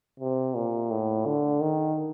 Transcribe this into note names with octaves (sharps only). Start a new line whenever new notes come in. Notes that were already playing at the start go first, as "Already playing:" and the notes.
C3
A#2
A2
D3
D#3